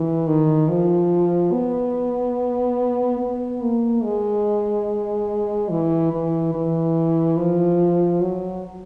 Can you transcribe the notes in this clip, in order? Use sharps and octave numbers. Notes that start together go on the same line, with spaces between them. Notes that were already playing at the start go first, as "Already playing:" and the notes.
Already playing: E3
D#3
F3
B3
B3
A#3
G#3
E3
E3
E3
F3
F#3